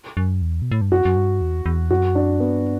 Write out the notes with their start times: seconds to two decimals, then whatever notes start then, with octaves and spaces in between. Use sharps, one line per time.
0.17 F#2
0.42 E2
0.62 B2
0.72 A2
0.81 G2
0.91 F#2 F#4
1.05 F#2
1.16 G2
1.41 E2
1.66 E2
1.91 F#2 F#4
2.15 D4
2.40 G2 B3